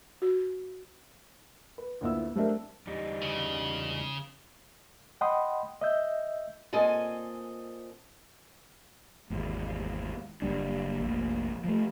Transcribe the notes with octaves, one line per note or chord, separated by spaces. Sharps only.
F#4
B4
D2 A#2 B3 E4 E5 E6
G3 A3 C4 D4 A#4 E5
E2 G3 D#4
C#3
D#5 F#5 G5 B5 C6 D#6
D#5 E5 E6 G6
A#2 C4 A4 D#5 G#5
G#1 E2
F#1 G2 G3 D4
F1 A#1
F3 A3